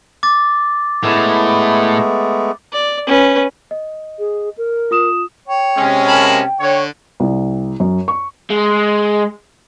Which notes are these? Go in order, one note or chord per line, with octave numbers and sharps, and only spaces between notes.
D6 A6
A2 G#3 A3 B3
D5
C#4 B4
D#5
G#4
A#4
F4 D#6 E7
C#5 G5
C3 G#3 C#4
A#3 A5 B5
D3 C#5
C2
F#2
C#6
G#3